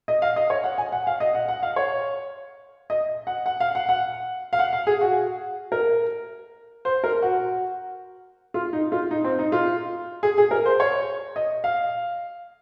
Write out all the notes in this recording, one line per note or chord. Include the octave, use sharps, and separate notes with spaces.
D#5
F5
D#5
C#5
F#5
G#5
F#5
F5
D#5
F#5
F#5
F5
C#5
D#5
F#5
F#5
F5
F#5
F#5
F5
F#5
F5
G#4
F#4
A#4
C5
A#4
F#4
F4
D#4
F4
D#4
C4
D#4
F4
G#4
G#4
A#4
C5
C#5
D#5
F5